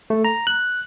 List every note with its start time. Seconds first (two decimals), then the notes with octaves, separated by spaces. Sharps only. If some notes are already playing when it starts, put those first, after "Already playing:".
0.10 A3
0.25 A#5
0.47 F#6